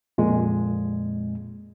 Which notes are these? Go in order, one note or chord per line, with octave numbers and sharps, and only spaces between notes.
F2 A#2 G#3